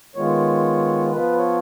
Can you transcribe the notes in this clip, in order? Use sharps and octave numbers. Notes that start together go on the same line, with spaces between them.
D#3 G#3 B3 F4 C#5
F3 B3 F4 B4
C#5